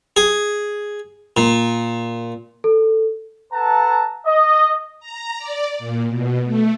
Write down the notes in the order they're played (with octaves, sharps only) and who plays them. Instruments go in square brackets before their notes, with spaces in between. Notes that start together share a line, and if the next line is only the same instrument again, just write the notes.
[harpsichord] G#4
A#2
[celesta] A4
[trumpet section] A4 B4 F#5 A5 A#5
D#5
[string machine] A#5
D5
A#2
B2
A3